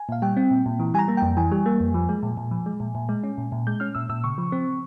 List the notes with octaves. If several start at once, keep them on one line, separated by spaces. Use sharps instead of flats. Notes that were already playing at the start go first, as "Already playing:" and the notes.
Already playing: G#5
A#2 F5
G3 G5
C4
A#2
A#2
E3
G3 G#5 A#5
A#3
F2 G5
E3 G#5
G3
A#3
F2
F3
G#3
A#2
A#2
F3
G#3
A#2
A#2
G#3
C#4
A#2
A#2
G#3 G6
C#4 F6
A#2 E6
A#2 E6
C#3 C#6
F3
C4